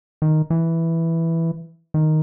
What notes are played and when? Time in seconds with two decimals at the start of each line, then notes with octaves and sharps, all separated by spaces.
0.22 D#3
0.50 E3
1.94 D#3